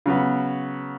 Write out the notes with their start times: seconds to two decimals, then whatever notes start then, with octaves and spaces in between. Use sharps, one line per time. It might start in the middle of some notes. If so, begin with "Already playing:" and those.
0.06 C#3 F#3 B3